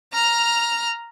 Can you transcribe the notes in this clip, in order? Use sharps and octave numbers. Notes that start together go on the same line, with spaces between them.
A#5 F6